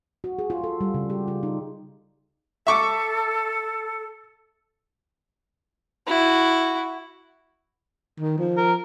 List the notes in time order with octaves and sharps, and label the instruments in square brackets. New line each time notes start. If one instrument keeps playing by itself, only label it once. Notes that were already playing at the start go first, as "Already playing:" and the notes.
[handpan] F#4
G#4
F4
A4
G3
C#3
G4
F4
D#4
[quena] A4 [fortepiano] E5 C#6 D6
[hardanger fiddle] E4 F#4
[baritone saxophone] D#3
F3
[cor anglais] A#4